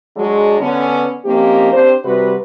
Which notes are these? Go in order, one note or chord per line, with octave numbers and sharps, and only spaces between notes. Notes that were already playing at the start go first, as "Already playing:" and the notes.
F#3 G#3 D4
D3 B3 C#4
F3 A#3 C4 C#4 D#4 G4
C4 D4 G4 C5
C3 G3 F#4 B4